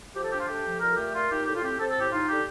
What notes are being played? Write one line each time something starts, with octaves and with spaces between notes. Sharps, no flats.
F3 G4
A4
D4 G4
F4
A3 G4
F3
A#2 A#4
A4
A3 G4
A#2 F4
D#4 G4
A2 G4
F4
C4 G4
C4 A4
A4
A2
G4
D#4 F4
D3 G4